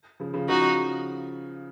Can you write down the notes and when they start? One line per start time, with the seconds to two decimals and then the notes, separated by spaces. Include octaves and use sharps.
0.20 C#3 F3
0.34 C#3 F3
0.48 C#3 F3 D#4 F#4